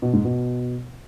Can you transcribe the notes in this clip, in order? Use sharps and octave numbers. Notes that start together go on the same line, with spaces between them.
B2
G#2
B2